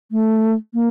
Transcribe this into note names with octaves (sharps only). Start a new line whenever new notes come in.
A3
A#3